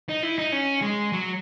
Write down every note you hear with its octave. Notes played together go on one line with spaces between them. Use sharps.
D#4
E4
D#4
C#4
G#3
F#3